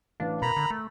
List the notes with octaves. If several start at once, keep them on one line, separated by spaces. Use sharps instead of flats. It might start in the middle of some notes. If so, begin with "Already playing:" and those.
A1 D4 B4 F5
B2 A#4 A#5 B5
D3
A3